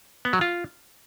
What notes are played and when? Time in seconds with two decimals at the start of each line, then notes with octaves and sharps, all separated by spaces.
0.25 B3
0.33 F#3
0.41 F4